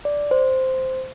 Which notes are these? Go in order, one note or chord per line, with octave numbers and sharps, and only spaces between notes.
D5
C5